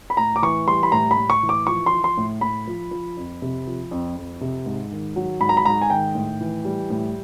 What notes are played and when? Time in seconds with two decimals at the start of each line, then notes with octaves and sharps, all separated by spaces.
0.10 B5
0.17 A2 A#5
0.36 D6
0.42 E3 C#6
0.67 G3 C6
0.83 B5
0.92 A2 A#5
1.11 B5
1.17 A2
1.30 C#6
1.43 E3
1.49 D6
1.67 F3 C#6
1.86 C6
1.93 F3
2.04 C6
2.17 A2
2.41 A2 B5
2.67 F3
2.91 F3
3.17 F2
3.42 C3
3.67 F3
3.91 F2
4.16 F2
4.41 C3
4.66 G#2
4.92 D#3
5.16 F#3
5.41 G#2 B5
5.49 A#5
5.57 B5
5.65 G#2 A#5
5.82 G#5
5.90 D#3 G5
6.15 A2
6.41 E3
6.65 G3
6.90 A2